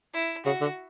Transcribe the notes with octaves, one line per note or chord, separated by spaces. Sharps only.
E4
C#3 F#4
D3